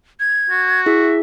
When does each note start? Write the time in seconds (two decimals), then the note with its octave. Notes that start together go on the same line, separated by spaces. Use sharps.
0.20 G#6
0.51 F#4
0.86 E4 G#4 E5